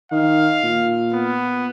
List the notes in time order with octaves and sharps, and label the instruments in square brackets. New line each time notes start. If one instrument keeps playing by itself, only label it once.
[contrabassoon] D#3 [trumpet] F5
[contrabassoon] A#2
[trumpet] B3